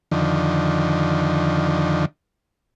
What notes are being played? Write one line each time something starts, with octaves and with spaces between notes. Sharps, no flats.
F2 D3 D#3